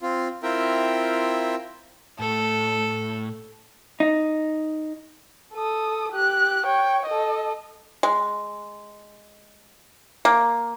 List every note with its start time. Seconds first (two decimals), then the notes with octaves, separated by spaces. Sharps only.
0.01 C4 F4
0.43 C4 E4 F4 A#4 E5 G5
2.20 A2 A4
4.00 D#4
5.54 A4 D#6
6.13 G4 F#6
6.66 C#5 G5
7.06 A4 D#5
8.03 G#3
10.25 A#3